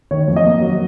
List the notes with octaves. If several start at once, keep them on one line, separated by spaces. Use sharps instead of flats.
D#3 C#5
F2
D#5
A#3
F#3